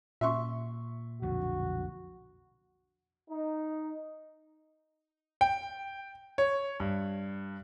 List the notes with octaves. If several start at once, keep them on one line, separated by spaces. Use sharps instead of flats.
A#2 E5 C6 C#6
B1 F2 D3 F#4
D#4
G5
C#5
G2